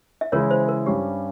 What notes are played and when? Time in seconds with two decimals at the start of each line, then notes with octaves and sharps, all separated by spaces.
0.21 E5
0.32 C#3 E3 G#3 E4 A#4 C#5
0.51 C5
0.69 A#4
0.86 G2 G3 C#4 G4